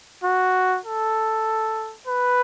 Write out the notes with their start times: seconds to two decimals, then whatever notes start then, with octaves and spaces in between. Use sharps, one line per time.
0.24 F#4
0.85 A4
2.07 B4